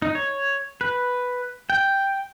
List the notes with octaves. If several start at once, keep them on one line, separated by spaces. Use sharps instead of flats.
D#4
C#5
B4
G5